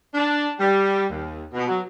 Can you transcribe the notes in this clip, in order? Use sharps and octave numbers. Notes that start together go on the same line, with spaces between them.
D4
G3
D#2
B2
F#3